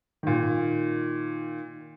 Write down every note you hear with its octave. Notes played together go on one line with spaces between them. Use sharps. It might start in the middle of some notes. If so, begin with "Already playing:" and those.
A#2 D#3